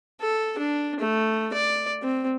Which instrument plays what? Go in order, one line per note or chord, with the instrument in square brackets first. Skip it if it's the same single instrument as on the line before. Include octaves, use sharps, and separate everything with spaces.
[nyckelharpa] A4
D4
A3
D5
C4